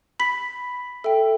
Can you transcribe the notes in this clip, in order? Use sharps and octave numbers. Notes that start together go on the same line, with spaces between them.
B5 B6
A4 E5 G5